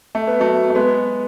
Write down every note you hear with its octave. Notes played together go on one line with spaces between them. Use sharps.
A3
B3
F#3 A3
A3
G#3 B3